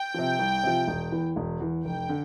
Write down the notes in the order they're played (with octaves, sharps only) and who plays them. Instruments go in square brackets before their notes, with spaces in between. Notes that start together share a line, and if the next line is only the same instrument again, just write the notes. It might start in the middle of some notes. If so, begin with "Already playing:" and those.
Already playing: [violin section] G5
[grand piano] C3 F3
C2
C3 F3
E1
E2 E3
E1
E2 E3
[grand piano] F1 [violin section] G5
[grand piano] D3